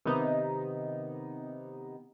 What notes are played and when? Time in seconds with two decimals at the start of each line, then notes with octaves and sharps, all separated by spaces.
0.05 C3 D#3 B3 D#4